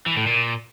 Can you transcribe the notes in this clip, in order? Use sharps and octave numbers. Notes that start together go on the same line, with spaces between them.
E3
A2
A#2